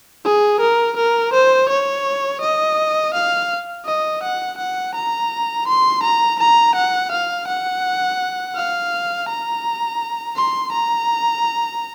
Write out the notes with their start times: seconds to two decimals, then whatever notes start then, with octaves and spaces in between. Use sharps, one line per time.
0.25 G#4
0.60 A#4
0.97 A#4
1.33 C5
1.69 C#5
2.41 D#5
3.14 F5
3.86 D#5
4.23 F#5
4.58 F#5
4.95 A#5
5.67 C6
6.03 A#5
6.40 A#5
6.75 F#5
7.11 F5
7.48 F#5
8.55 F5
9.29 A#5
10.36 C6
10.72 A#5